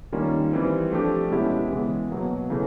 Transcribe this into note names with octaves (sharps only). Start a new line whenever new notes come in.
D#3 G3 A#3 C#4 F4
E3 G3 C4
F3 A3 D4 G4
B2 G#3 C#4 E4 G4
C#3 E3 G#3 B3
B2 F#3 A#3
C#3 E3 A3